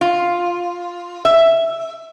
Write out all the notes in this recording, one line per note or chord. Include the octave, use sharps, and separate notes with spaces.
F4
E5